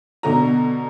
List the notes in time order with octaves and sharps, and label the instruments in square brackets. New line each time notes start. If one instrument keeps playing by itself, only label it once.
[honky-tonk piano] B2 D3 A#5